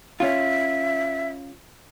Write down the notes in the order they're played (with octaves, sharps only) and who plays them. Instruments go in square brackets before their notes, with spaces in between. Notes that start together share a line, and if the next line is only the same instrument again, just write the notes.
[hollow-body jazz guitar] C#4 F4 [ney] E5